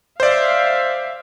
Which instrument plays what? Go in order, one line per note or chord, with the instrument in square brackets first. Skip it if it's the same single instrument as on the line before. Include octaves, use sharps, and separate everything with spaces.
[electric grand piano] C5 D5 [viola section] E5 F5